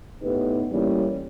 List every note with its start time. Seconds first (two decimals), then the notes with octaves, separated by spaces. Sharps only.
0.22 A2 B3 D#4 G4 B4
0.72 A2 E3 G3 A#3 C#4 E4